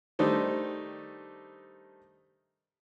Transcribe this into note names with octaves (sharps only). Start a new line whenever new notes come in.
D#3 G3 A3 D4 D#4 C5